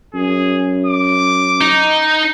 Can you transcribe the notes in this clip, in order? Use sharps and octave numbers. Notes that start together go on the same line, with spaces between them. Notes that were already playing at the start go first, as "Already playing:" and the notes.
F#2 G#4
D6
D#4